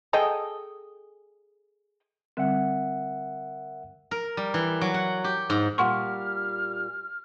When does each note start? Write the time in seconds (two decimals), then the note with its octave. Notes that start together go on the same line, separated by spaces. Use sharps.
0.13 G#4 A4 D#5 G5
2.37 D3 G3 C4 A#4 E5 F#5
4.11 A#4
4.37 G3
4.54 E3
4.81 F#3
4.94 F#5
5.24 G4
5.50 G#2
5.78 A#2 G3 F#5 C6 C#6 F6